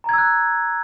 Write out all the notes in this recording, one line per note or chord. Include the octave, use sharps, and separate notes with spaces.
A#5 E6 F#6 G#6